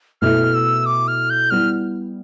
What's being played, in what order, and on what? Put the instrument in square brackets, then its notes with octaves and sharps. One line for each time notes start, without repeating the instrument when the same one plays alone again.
[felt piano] B2 A3 E4 A4 E5 [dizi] F6
[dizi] E6
D6
F6
G6
[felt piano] G3 B3 E4 [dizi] F6